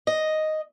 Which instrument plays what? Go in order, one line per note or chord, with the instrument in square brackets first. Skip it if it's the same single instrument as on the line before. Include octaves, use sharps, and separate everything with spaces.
[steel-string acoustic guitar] D#5